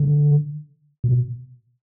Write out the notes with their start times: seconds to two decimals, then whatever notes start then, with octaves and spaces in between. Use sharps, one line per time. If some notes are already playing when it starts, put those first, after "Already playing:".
Already playing: D3
1.04 B2